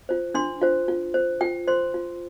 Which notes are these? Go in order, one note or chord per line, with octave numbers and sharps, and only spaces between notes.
F4 C5
D4 C6
F4 C5
F4
C5
F4 G5
C5 C6
F4